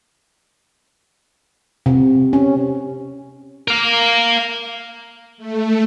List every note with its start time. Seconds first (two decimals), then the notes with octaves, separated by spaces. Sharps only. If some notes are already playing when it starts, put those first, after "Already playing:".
1.86 C3
2.33 C#4
3.68 A#4 F5
5.38 A3